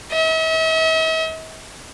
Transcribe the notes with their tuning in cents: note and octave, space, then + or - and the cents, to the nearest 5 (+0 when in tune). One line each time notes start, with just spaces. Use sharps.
E5 -45